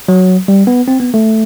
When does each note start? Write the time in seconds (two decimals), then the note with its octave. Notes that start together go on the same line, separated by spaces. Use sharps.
0.08 F#3
0.48 G3
0.67 B3
0.88 C4
1.00 B3
1.14 A3